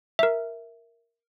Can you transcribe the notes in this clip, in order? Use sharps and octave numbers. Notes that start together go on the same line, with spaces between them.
A#4 E5